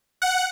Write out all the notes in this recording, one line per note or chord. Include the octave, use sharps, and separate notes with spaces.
F#5